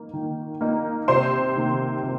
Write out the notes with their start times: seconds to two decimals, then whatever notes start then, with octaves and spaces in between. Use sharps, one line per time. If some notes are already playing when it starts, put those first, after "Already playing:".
Already playing: A#3 D#4
0.13 D#3
0.61 A#3 D#4
1.08 C3 C5 C6
1.56 D#3 A#3
2.03 C3